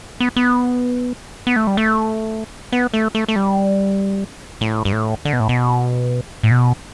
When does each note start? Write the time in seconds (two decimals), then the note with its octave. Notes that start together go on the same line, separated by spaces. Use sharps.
0.20 B3
0.36 B3
1.47 B3
1.56 A3
1.67 G3
1.77 A3
2.72 B3
2.94 A3
3.15 A3
3.28 A3
3.36 G3
4.61 A2
4.85 G2
4.93 A2
5.25 D3
5.33 B2
5.40 A2
5.49 B2
6.43 A2
6.51 B2